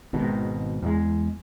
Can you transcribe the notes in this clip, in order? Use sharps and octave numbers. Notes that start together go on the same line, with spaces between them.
G#1 G#2 B2 D#3
E2 G#3